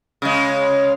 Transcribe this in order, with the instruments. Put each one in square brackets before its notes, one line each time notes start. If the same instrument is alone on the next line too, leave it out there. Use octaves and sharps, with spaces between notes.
[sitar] C#3 G#3